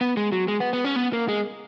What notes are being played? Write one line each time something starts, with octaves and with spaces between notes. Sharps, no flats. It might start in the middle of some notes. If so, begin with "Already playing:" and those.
B3
G#3
F#3
G#3
B3
B3
C#4
B3
A#3
G#3